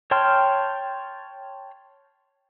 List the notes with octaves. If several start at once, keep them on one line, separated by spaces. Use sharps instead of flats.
C#5 G5 A5 C6 F6